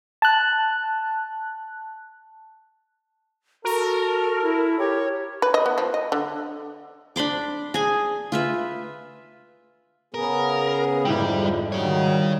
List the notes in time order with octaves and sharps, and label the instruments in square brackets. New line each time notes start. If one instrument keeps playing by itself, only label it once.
[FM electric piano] A5 F#6
[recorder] F#4 [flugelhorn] A4 [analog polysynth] A#4
[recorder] E4
[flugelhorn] G4 [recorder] C#5
[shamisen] B4
D#5
B3
F3
D#5
D3
[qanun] D4 B5 C6 D6
G#4 G#5
F4 B4 E5
[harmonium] C#3 B3 G#4 [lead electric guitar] A#4
[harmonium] F2 D3 [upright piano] G#2 E4 G5 [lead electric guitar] G3
[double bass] D#3 G3 [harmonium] F#3 [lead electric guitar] G#4 C#5